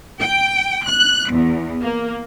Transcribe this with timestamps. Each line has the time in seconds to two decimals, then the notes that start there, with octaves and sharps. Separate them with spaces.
0.21 G5
0.86 F#6
1.31 E2
1.83 A#3